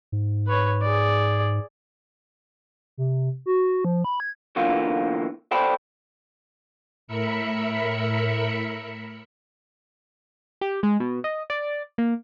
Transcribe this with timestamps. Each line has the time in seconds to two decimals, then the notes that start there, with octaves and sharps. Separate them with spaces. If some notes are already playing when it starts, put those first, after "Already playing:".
0.12 G#2
0.48 B4 C#5
0.82 G#4 D5
2.97 C3
3.46 F#4
3.85 F3
4.04 B5
4.20 G#6
4.56 B1 D3 E3 A#3 F4
5.51 A4 C5 D5 G5 A5 B5
7.07 A2 A#4 E5 B5 C#7
10.61 G4
10.83 G#3
11.00 B2
11.24 D#5
11.50 D5
11.98 A#3